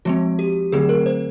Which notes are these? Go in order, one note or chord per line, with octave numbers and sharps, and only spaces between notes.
F3 G#3 C4 F#4
G4
D3 F#3 A3 C4 G#4
A#4
C5